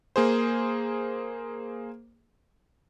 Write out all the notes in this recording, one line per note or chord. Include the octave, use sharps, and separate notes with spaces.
A#3 G#4 C5